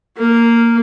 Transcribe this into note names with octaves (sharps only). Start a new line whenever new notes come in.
A#3